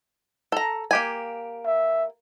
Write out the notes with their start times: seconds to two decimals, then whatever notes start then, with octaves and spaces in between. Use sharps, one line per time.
0.52 A4 A#5
0.91 A#3 G4 G#5
1.65 E5